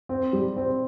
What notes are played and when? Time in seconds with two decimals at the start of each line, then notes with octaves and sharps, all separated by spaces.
0.09 C4
0.33 G3
0.57 C4